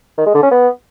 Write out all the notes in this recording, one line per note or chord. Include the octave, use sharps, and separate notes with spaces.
D#3
G#3
D3
C#4
B3